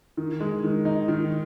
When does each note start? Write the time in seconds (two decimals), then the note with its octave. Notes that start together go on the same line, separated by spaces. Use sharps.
0.17 D#3
0.40 G#3
0.64 D#3
0.85 D#4
1.08 D#3